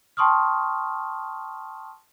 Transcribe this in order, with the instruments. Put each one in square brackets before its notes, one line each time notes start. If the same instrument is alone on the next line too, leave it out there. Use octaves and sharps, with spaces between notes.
[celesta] G5 A5 C6 C#6 D#6 F6